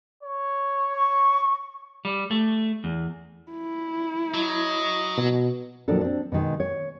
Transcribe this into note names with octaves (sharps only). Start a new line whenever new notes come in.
C#5
C#6
G3
A3
E2
E4
F#3 D#5
B2
A#2 D#3 F3 F#3 D4 A4
C4 D4
B2 D3 D#3 G#3
C#5